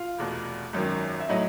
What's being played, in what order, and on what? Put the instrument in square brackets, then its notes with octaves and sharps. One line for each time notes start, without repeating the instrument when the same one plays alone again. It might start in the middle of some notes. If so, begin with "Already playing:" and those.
Already playing: [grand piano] F4 F5
[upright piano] F1 E2 B2
G#1 F#2 D#3
[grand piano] E5
[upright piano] A2 F#3 [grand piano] D#4 D#5